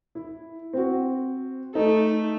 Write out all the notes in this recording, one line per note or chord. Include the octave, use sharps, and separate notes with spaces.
E4
C4 F#4
A3 D#4 A4